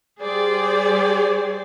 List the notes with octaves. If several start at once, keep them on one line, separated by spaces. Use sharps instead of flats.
G3 G#4 C5 D5